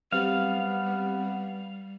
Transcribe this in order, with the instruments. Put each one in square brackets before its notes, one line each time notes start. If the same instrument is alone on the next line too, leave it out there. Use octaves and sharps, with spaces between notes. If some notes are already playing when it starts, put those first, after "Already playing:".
[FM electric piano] F#3 C4 G4 [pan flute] G3 [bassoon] B3 [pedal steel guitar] F5